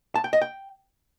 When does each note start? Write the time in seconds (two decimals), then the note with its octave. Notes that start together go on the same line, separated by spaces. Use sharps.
0.15 A5
0.24 G5
0.33 D#5
0.42 G5